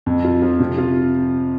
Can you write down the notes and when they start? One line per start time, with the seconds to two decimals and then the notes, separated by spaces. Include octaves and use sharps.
0.06 F2
0.24 F4
0.42 F3
0.60 C3
0.78 F4